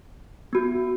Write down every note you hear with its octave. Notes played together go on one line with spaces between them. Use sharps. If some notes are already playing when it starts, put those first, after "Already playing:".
B3 F#4